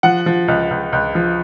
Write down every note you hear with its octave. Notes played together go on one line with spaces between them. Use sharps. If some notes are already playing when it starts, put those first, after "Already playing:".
F3 F#5
F3
C#2
C#2
C#2
F3